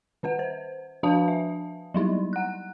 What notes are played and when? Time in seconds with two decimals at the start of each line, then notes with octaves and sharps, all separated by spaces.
0.23 D#3 C#4 B4 F#5
0.39 C5
1.03 F3 D4 B4 F5 A5 D#6
1.28 E5
1.94 F#3 G3 D#4 E4
2.33 F#5 F#6